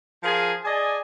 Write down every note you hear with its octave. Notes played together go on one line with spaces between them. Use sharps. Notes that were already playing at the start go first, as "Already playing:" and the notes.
F3 F4 G#4 A#4 G#5
G#4 D5 D#5 G#5 A5